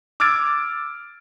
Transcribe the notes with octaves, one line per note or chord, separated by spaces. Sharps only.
D6 E6 F6 G#6 A6 D7